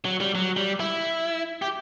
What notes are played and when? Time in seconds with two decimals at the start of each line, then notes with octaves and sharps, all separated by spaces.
0.05 F#3
0.20 G3
0.35 F#3
0.57 G3
0.80 E4
1.62 G4